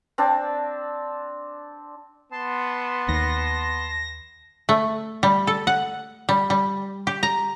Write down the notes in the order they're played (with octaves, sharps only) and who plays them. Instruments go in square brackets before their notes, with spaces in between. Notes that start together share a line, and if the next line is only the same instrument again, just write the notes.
[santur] C4 D4 D5 A5
[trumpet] B3 [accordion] A5 C6
[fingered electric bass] D#2 [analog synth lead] A#6
[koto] A3
G3
A4
F#5
G3
G3
G4
A#5